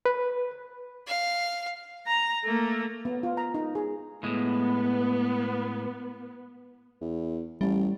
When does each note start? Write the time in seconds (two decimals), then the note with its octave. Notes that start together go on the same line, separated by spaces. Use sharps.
0.06 B4
1.07 F5
2.07 A#5
2.44 A3 A#3
3.05 B3
3.23 F4
3.37 A#5
3.54 D#4
3.75 G#4
4.23 A2 G#3 B3
7.01 E2
7.61 A1 G3